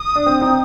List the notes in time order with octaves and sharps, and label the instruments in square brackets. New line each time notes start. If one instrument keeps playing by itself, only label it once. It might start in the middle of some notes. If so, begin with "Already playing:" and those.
Already playing: [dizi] D#6
[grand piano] D4
C4
C4 D#4